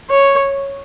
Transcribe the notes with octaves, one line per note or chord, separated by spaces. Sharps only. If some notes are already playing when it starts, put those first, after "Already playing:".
C#5